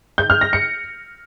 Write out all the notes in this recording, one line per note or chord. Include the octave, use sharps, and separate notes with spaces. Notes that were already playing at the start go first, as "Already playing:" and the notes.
G6
F6
A#6
C#7